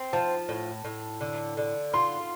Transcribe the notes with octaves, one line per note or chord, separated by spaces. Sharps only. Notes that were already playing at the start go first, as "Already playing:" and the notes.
Already playing: C4
F3 A5
A2
A2
D3
D3
F4 C6